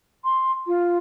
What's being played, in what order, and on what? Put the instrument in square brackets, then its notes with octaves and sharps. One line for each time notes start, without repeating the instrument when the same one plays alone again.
[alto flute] C6
F4